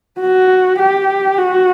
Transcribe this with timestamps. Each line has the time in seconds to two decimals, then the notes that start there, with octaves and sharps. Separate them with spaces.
0.20 F#4
0.79 G4
1.38 F#4